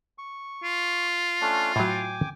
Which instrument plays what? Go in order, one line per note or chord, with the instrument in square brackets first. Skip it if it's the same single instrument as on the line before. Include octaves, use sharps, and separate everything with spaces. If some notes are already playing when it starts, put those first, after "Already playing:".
[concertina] C#6
[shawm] F4
[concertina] A3 C#4 D4
[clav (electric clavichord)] A2 F#3 [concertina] G5 G#5 D6